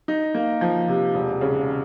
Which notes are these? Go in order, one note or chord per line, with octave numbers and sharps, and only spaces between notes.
D#4
A#3
F3
C3
E1
C#3